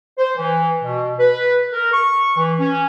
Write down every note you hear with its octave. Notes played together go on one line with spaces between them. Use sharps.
C5
E3
B2
B4
A#4
C#6
E3
C#4